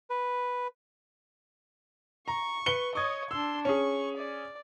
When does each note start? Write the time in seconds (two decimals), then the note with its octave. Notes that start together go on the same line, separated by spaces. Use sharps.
0.10 B4
2.28 A#5 C#6
2.66 B4 C#7 G7
2.95 C#5 D#5 C#6 D#6 G#6
3.31 D4 C6 E6
3.65 C#4 G#4 C#6
4.17 D5